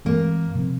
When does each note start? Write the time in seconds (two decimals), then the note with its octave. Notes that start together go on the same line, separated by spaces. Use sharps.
0.05 G2 E3 G#3 A#3 C4
0.55 C3 F3 C4